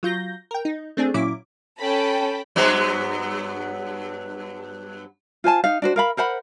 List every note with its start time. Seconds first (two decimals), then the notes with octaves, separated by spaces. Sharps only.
0.03 F#3 F4 G6 A#6
0.51 A#4 G5
0.65 D#4
0.97 A3 C4 D4 G#4
1.14 A#2 F#3 C#4 E4 D6
1.79 C#4 A4 G5 A5 B5
2.56 G2 F#3 B3
5.44 F4 C5 G#5 A5
5.64 D#4 F5
5.82 D4 F#4 C5
5.96 A#4 F5 B5
6.17 A#4 C5 F#5 B5